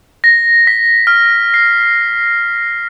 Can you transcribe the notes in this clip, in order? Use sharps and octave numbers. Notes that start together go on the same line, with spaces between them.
A#6
B6
F6
C7